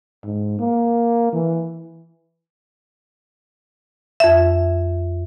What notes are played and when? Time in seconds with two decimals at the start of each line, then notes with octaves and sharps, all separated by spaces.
0.24 G#2
0.59 A#3
1.33 E3
4.20 F2 E5